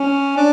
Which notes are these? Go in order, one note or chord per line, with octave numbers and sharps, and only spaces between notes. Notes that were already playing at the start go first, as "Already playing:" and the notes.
Already playing: C#4
D4